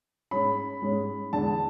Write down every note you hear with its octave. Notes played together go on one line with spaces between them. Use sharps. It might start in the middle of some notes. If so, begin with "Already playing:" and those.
G#2 G#3 C#4 B5
G#2 G#3 C#4
E2 D3 G#3 A5